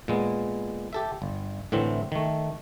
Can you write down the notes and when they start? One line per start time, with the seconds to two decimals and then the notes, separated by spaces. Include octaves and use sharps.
0.08 A#2 G#3 B3
0.93 G4 A4 E5
1.22 G1
1.72 A2 D3 E3 C4
2.12 D#3 A3